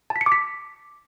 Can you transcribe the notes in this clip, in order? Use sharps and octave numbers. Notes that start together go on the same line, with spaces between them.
A5
B6
C#7
D6
B6